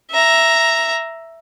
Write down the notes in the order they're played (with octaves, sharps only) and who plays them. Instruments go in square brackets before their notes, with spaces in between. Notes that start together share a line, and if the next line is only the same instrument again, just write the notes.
[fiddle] E5 A#5